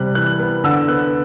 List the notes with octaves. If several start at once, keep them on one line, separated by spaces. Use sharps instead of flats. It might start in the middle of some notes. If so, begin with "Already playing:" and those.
Already playing: C3 G3 F#6
E3 F#6
B3
D3 E6
B3 F#6